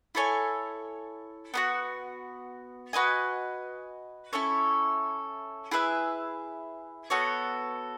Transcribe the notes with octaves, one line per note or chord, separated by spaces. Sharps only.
E4 A4 C#5 G#5
B3 D#4 F#4
F#4 B4 D#5 G#5
C#4 E4 A4 C#5
E4 G#4 B4 E5
B3 F#4 A4 C#5